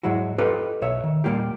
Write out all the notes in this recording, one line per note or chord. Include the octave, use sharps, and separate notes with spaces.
G#2 F#3 G#3 E4 F#4
D#4 F4 G4 A4 B4
B1 B2 C#5 E5
D#3
A#2 G3 G#3 A#3 F4 G4